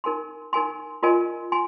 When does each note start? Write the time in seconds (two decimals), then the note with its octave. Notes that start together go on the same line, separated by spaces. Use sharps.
0.04 D#4 A#4 G#5 C6
0.53 D#4 A#4 G#5 C6
1.03 F4 A#4 D#5 G#5 C6
1.52 G#5 C6